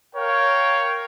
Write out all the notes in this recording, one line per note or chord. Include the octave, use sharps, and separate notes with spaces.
A#4 C#5 F5 G5